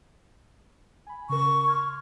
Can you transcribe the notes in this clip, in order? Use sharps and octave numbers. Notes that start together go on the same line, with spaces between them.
G#5 B5
C#3 A#4 C#6
C6 F6 G#6